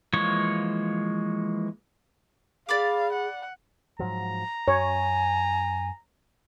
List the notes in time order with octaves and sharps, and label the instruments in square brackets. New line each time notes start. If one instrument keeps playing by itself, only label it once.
[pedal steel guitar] E3 F3 G#3 A#3 C#5
[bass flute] G#4 [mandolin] D5 B5 D6 [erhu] F5
[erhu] F#5
[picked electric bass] G#2 F3 F#3 [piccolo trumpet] A#5
[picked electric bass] F#2 [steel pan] C#5 [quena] G#5